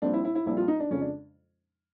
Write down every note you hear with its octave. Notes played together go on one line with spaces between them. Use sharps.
A#1 A#2 G3 C4 D4
E4
E4
E4
A#1 A#2 G3 C4 E4
F4
D#4
D4
F2 C#3 F3 G#3 C#4
D4